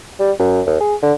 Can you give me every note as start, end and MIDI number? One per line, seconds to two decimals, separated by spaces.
0.19 0.32 55
0.39 0.61 42
0.67 0.81 39
0.81 0.95 68
1.03 1.13 50